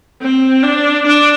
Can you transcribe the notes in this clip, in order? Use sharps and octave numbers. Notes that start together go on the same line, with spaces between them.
C4
D4
D4